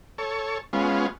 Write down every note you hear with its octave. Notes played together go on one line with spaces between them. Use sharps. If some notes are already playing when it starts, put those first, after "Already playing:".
A4 C#5
G#3 B3 C#4 F4